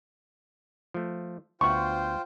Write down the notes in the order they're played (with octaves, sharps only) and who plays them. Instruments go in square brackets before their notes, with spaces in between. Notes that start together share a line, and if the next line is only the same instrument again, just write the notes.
[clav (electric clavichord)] F3 A3
[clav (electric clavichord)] D2 B3 F#5 [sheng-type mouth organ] F4 C5 G5 [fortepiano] C#6